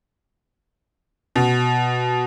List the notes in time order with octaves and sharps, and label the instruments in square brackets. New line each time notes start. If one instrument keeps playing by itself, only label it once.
[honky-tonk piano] B2